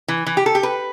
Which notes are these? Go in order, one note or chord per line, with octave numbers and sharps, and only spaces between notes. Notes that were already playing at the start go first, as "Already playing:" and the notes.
E3
E3
G4
A4
G4
B4